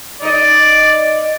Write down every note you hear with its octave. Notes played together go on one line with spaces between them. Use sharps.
D#4 D5 D#5